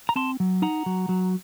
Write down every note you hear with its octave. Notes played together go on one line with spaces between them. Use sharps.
A#5
C4 A5 C6
F#3
D#4 F#5 A#5
F#3
F#3